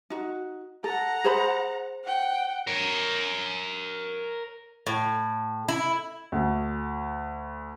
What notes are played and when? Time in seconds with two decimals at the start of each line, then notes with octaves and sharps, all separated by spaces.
0.10 D#4 F#4
0.84 A4 F#5 A#5
1.24 G#4 C5 B5
2.04 F#5 G5
2.67 A#4 C#5
4.87 A2
5.68 E4
6.32 D2